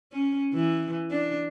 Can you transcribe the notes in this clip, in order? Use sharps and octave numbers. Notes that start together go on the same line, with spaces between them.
C#4
E3
D4